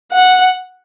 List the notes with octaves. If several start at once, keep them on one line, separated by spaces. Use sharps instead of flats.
F#5